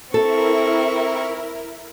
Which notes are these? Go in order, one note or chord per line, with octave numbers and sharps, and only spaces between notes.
C4 E4 A4 A#4 E5 C#6